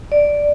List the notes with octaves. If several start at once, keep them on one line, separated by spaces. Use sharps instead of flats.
D5